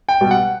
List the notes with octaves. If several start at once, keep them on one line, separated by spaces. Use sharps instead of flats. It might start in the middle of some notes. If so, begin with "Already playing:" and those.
G5
B2 G3
F#5